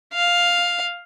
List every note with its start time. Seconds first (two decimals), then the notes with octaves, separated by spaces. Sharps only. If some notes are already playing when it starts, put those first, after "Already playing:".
0.13 F5